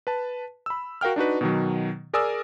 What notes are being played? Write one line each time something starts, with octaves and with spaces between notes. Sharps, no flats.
B4 A5
B5 E6
F#4 A#4 F5 G5 F6
D4 D#4 F#4 B4
B2 D#3 F#3
G#4 A#4 D5 G#5 D#6 E6